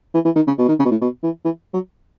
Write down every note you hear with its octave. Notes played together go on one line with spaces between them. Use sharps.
E3
E3
D#3
C#3
B2
D#3
C#3
B2
A2
B2
E3
E3
F#3